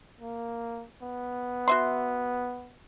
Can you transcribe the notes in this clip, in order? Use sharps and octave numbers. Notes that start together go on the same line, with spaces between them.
A#3
B3
F#4 E5 C6